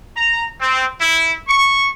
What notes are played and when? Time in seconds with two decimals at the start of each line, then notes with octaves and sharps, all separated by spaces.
0.16 A#5
0.61 C4
1.00 E4
1.49 C#6